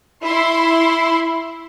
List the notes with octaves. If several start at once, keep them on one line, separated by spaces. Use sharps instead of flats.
E4 C6